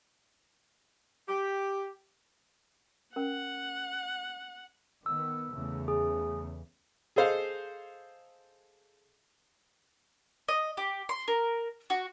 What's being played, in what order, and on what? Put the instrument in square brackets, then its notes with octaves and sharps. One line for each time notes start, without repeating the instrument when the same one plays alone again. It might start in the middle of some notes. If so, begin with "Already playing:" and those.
[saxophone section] G4
[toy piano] C#4 A#4 [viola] F#5
[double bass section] D#3 B3 [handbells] E6
[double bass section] E2 C#3 A3
[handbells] G#4
[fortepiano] G#4 A4 C5 D#5 F5
[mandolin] D#5
G4
C6
A#4
F#4